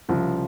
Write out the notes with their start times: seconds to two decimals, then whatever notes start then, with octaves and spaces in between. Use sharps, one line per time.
0.09 C2 C#3 F3